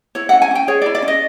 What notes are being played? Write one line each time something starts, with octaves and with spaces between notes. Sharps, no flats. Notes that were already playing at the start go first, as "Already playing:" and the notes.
E4 C#5
C#4 F#5
G#5
C#4 G5
G#4 C#5
D5
E4
D5
C#4
D#5